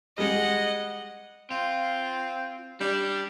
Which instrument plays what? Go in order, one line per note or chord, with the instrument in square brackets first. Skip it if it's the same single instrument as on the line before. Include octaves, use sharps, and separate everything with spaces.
[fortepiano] G3 G#3 [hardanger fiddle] D#5 F#5
[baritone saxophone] C4 [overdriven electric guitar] F4
[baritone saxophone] G3 [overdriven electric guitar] D4 D5